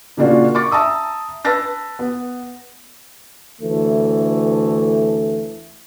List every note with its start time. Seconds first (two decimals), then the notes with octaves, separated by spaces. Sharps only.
0.17 A#2 C#3 A#3 D4 F4 F#4
0.55 C#6 D6 A6
0.71 E5 A5 A#5 D#6 E6
1.45 B4 A5 E6 A6 A#6
1.99 B3
3.61 D2 E3 A3